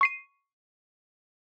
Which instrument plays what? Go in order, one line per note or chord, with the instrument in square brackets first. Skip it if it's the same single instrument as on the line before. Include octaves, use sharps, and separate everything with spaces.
[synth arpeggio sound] C#6 C7 D#7